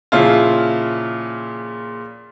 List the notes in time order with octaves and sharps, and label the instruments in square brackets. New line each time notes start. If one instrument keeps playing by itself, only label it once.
[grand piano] A#2 C#3 F3 E4 F4